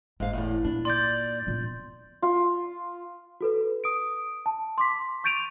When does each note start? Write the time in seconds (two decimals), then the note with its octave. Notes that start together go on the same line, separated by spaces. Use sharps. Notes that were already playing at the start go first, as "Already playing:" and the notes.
0.20 G1 G#2 F5
0.33 E2 A2
0.65 A#2 D4
0.85 D5 C6 G6
1.47 A#2 B3
2.22 F4
3.41 F#4 A4 B4
3.84 D#6 D7
4.46 A5
4.78 C6 D6 B6
5.24 C#6 G6 A6 D7 D#7 F7